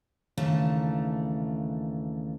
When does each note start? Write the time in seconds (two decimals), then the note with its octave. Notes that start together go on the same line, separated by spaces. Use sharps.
0.38 D#2 C#3 E3 A3 D4 A#4